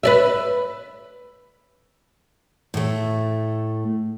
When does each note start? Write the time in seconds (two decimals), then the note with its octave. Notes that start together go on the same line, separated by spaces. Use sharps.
0.03 B4 D5 E5
2.74 A2 A3